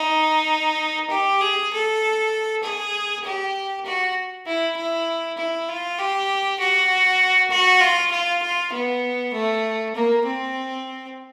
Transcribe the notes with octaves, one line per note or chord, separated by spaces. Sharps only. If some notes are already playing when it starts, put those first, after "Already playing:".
Already playing: D#4
G4
G#4
A4
G#4
G4
F#4
E4
E4
E4
F4
G4
F#4
F#4
F4
F4
F4
B3
A3
A#3
C4